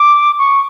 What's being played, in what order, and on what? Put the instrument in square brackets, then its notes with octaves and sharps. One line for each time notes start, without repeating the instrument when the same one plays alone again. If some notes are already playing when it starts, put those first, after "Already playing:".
Already playing: [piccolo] D6
C#6